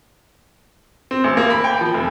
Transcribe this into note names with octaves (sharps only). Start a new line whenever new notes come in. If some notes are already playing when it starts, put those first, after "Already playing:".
C4
A1
A#3
B5
G5
F3
F1